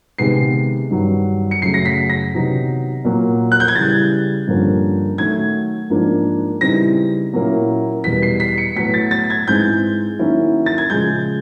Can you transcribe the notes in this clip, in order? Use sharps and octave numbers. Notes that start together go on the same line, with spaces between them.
C3 D#3 G#3 B3 C7
G2 D#3 F#3
C#7
F#2 C#3 F#3 A3 C7
A#6
B6
A#6
C3 D#3 F#3 B3 D#4
A#2 F#3 A#3
F#6
G6
G#6
C#3 E3 G3 A6
G2 D3 F3 A#3 C#4
D#3 F#3 A3 G#6
G#2 F3 A#3 D4
C#3 E3 G3 C4 D#4 A#6
A#2 F#3 A#3 C#4 E4
E2 B2 G3 B6
C7
B6
C#7
A2 F#3 B3 B6
A6
A6
G#6
G#2 E3 G#3 C4 G6
D#3 F#3 A#3 C#4 E4
A6
G#6
C#3 F3 G#3 G6